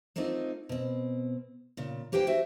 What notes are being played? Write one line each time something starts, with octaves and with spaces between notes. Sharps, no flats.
A3 A#3 C4 D#4 F4
B2 C4
A#2 C#3
A#3 G4 B4 C5 G5
F#4 C5 E5